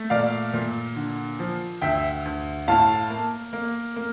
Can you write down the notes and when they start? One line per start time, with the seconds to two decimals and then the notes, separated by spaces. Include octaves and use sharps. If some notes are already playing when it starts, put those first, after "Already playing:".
Already playing: A3
0.10 A#2 D5 F5
0.54 A#2
0.96 D3
1.39 F3
1.81 D2 E5 G5
2.25 D2
2.68 A2 F5 A5
3.10 A#3
3.53 A#3
3.96 A#3